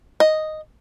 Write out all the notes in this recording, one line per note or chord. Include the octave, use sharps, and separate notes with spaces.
D#5